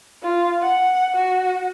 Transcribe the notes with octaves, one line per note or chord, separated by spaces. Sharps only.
F4
F#5
F#4